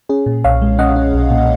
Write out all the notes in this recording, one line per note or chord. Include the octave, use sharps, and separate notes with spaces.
C#4 G#4
A#2
B1 C#5 F5
G#3
C#4 D#5 F#5
C#4
B1
A#2